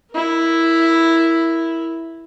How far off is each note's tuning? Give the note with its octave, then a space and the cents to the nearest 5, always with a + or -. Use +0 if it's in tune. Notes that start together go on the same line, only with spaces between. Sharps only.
E4 +0 A#4 +0